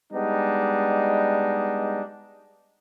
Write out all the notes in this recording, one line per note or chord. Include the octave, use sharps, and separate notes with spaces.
G3 G#3 B3 D4 D#4